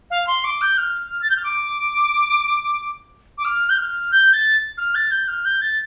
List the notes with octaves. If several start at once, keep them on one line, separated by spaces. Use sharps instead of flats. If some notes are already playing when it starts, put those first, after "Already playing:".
F5
C6
D6
G6
F6
A6
G6
F6
D6
D6
F6
G6
F6
G6
A6
F6
A6
G6
F6
G6
A6